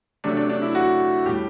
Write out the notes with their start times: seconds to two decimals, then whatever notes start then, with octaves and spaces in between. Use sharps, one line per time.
0.24 C3 F#3 A3 D4
0.37 D4
0.49 D4
0.62 E4
0.75 F#4
1.26 A2 G3 G4